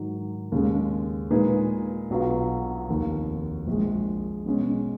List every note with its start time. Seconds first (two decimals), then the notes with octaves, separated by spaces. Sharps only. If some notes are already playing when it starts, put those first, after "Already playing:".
Already playing: G#2 D#3 F#3
0.52 D#2 C#3 G#3 C#4
1.31 A#2 G#3 D#4 G#4 B4
2.10 B1 B2 F#3 B3 F4
2.88 F1 D#2 D#3
3.67 A#1 A#2 G#3
4.46 B2 G#3 C#4